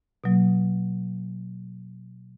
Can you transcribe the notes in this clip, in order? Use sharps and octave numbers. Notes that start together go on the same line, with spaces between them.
B2 F#3 A#3